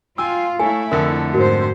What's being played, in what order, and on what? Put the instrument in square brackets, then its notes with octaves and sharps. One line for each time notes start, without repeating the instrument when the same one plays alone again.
[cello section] F4 [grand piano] G5 G#5 [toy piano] E6
[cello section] A3 E4 [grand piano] A4 C#5 F5 [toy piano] G#5
[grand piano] F2 D3 E6 [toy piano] A#4
[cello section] G#2 C5 [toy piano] F#4 A#4